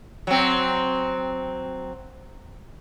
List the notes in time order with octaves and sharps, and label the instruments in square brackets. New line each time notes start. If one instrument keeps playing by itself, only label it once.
[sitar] F#3 C4